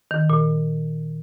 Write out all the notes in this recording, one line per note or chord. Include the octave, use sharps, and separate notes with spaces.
D#3
A#2